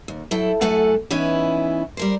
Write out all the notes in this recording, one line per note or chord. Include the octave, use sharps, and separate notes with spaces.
D#2
F#3 E4 A4 G5
F#2 A2 A3 A4 F#5 G#5
E3 B3 C#4 D#4 E4
G3 A#4 C5